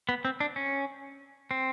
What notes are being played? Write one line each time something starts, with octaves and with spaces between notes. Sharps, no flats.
B3
C4
D4
C#4
C4